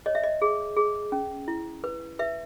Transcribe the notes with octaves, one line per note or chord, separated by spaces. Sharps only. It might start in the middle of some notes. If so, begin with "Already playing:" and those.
C#5 D#5
E5
D#5
G#4
G#4
C#4
E4
B4
B4 E5